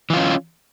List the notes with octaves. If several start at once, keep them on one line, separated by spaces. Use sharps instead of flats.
E3 C#4 F4